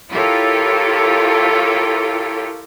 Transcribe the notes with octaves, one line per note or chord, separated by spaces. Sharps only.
E4 F4 G4 A4 A#4 C#5